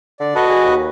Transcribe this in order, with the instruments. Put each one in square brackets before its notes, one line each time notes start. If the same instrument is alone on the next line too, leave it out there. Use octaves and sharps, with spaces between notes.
[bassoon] D3 [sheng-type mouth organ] D5
[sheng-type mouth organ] F#4 B4 D#5 [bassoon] A4
[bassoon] G#4
D#2